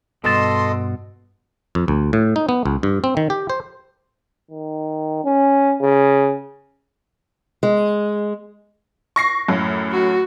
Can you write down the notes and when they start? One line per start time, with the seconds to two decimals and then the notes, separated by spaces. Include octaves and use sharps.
0.24 G2 B2 A4 D#5 A5 C6
1.75 F2
1.88 D2
2.13 A2
2.36 D#4
2.49 B3
2.65 C#2
2.83 G2
3.04 C4
3.17 D#3
3.30 G4
3.50 C5
4.51 D#3
5.25 C#4
5.82 C#3
7.63 G#3
9.16 C#6 A#6 C7
9.48 F#2 A2
9.92 F#4